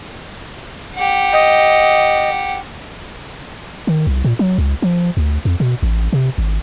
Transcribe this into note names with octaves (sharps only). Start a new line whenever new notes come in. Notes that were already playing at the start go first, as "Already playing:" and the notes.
G4 F#5
D#5
D#3
C2
A#2
F#3
C#2
F3
D2
F2
B2
A1
C3
G#1